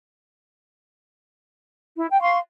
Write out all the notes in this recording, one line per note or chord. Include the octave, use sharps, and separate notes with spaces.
E4
G5
F5 C6 C#6